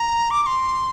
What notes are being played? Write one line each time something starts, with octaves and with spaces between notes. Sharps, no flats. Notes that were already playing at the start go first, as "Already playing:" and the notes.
Already playing: A#5
D6
D6
C6